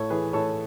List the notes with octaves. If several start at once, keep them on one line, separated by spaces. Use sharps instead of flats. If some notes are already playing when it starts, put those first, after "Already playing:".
Already playing: A2 A4 C#5
E3 G#4 B4
A2 A4 C#5